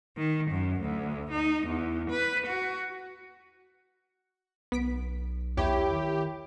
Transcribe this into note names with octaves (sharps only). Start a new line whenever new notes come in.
D#3
F#2
D2
D#4
E2
B4
F#4
B1 B3 B6 D7
E2 E4 G4 C#5
D#3